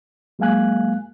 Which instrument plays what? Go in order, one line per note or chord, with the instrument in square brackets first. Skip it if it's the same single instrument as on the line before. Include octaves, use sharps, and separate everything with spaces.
[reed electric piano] F#3 G#3 A#3 F5 G#5 F#6